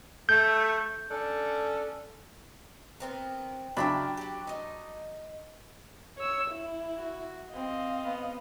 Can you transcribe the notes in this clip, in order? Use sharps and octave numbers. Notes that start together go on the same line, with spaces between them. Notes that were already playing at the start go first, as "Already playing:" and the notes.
A3 G6
C#4 D4 A4
B3 C4 A#4
C#3 F#3 D4 E5 G5 B5
F#4 G4
D#4 D#5
C#5 E6
E4
F#4
C4 D#5 F5
B3